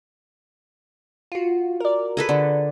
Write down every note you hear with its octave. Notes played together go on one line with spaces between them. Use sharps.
F4 F#4
A#4 D5
G#4 A4 B4
D3